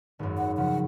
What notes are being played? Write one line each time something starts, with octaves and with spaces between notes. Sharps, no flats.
G#1 F#2
F#5
C#3 F3 F#5